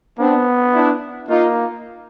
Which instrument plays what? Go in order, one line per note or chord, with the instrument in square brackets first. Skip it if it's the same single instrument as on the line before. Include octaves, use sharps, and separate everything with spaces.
[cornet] B3 [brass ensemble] C4 D4
[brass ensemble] D4 E4
[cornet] A#3 [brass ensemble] D#4 F4